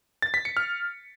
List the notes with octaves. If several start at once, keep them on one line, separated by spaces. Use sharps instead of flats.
A6
B6
C#7
F6